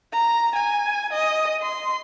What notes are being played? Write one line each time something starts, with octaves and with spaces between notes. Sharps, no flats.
A#5
G#5
D#5
C6